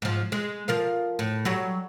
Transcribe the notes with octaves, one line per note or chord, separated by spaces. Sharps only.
G#2 F3
G#3
F3 A#4 F5
A2
F#3 G3